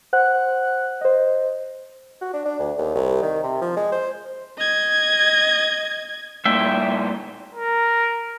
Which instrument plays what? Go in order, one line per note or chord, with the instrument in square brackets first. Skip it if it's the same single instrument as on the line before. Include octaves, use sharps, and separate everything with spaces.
[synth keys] C5 F#5 F#6
C5 D#5
[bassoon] F#4
D4
D4
D2
D#2
C2
D#3
C3
F3
G#3
C5
[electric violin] D#5 G#6
[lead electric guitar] G2 A#2 [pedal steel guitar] E5 G5
[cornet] A#4